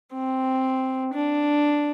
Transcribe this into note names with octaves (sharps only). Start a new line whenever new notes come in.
C4
D4